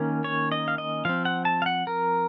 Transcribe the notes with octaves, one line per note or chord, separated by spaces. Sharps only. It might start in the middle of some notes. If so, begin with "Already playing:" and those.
Already playing: D#3 A#3 C#4
C#5
D#5
F5
D#5
F3 C4 F5
F#5
A5
F5
F#5
A#4